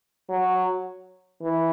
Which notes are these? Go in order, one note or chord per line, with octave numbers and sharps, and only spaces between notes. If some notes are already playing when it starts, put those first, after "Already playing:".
F#3
E3